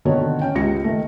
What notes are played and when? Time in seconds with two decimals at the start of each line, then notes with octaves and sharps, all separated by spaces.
0.05 B2 D3 D#3 F#4 A#4 C#5
0.41 C#4 G5
0.55 C#2 G4 A#6 C#7
0.84 D#3 A3